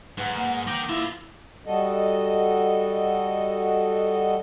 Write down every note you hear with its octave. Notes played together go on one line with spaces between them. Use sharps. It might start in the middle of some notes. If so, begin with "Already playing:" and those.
G#2 B4 F#5 B5
A#3
A#4 G5 D6 G6 A#6
E4 F4 E5
G3 F#4 A4 D#5